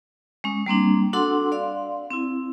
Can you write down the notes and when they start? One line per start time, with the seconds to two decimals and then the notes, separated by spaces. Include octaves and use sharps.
0.44 G#3 C#4
0.66 G3 A#3 C4 D4
1.13 D4 F#4 A4 F#5 C6 E6
1.52 D5 F5 C6
2.11 C4 E4